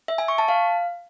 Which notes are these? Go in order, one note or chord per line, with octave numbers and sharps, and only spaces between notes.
E5
G#5
C#6
A5
F5